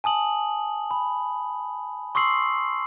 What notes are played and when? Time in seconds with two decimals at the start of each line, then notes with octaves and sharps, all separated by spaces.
0.04 G#5 A5 D#6 F#7
0.91 B5
2.15 C6 C#6 D#6 E6 C7 F#7